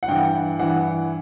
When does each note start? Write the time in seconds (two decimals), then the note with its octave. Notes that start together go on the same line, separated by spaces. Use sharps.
0.03 F#5
0.08 G2 E3 G5
0.59 G2 E3 F#5